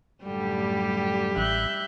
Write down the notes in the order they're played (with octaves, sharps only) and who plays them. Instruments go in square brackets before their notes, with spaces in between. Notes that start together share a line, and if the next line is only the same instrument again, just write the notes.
[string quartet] F#2 A2 D3 [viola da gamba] G3 G4
[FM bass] A1 [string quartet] E5 F#6 G6